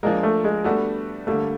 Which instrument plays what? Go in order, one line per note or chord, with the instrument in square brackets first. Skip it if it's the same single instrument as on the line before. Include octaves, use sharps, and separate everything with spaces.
[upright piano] F3 A#3 D4 F4 A#4 [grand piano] G#3
[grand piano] A3
G#3
[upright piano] G3 B3 D4 F#4 [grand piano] A3
[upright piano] D3 G3 A#3 [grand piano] A3